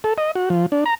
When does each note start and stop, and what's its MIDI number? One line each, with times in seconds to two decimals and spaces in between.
0.04 0.14 69
0.18 0.31 75
0.35 0.49 66
0.50 0.66 53
0.72 0.84 62
0.86 0.94 82